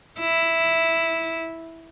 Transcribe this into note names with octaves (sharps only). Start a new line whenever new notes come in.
E4